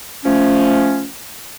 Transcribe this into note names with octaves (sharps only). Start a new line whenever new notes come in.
F3 A3 C#4